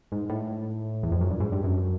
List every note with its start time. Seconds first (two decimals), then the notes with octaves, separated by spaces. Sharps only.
0.12 G#2
0.30 A2
1.03 E2
1.12 F2
1.21 F#2
1.31 G2
1.40 G#2
1.52 G2
1.64 F#2